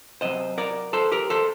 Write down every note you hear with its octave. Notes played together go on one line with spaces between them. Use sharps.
C3 F#3 C5 D#5
A#4 D5
A4 C5
G4 A#4
A4 C5